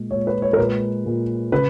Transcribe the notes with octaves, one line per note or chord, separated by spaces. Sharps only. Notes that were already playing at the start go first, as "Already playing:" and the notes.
Already playing: A#2 G#3
A#2 G#3 C#5
B4
C#5
A#4
A#2 G#3 B4
A#2 G#3
C#3 B4